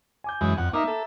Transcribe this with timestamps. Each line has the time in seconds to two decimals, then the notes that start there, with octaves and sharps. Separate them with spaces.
0.24 G#5 D6 G6
0.41 F#2 E3 G#3
0.58 F2 F#5
0.73 A#3 D#4 E5 A#5 D6
0.87 A4